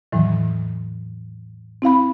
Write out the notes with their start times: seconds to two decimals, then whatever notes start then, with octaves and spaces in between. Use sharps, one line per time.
0.12 E2 A2 D#3 E3 F#3
1.82 C4 E4 F5 B5